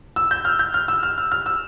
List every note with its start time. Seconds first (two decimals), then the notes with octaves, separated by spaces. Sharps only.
0.16 E6
0.31 G6
0.45 F6
0.59 G6
0.74 F6
0.88 E6
1.03 F6
1.18 F6
1.32 F6
1.46 E6